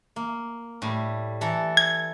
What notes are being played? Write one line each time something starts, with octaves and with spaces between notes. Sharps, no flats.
A#3
A2 G3
E3 A4 A#5
G#6